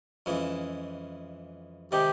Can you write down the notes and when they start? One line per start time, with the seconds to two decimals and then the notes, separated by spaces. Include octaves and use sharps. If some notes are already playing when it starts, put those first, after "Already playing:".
0.26 F2 C#3 E3 G#3
1.92 C3 D#3 G#3 G4